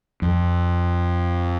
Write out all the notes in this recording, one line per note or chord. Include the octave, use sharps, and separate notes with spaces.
F2